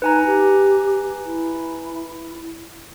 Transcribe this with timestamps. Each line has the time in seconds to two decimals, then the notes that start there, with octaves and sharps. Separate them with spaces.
0.02 D#4 B4 G#5 A#5
0.26 G4
1.26 E4